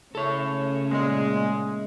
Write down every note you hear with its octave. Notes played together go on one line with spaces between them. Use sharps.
C#3 A3 C#4 A4 C#5
A#2 G#3